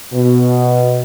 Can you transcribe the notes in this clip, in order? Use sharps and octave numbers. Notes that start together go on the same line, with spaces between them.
B2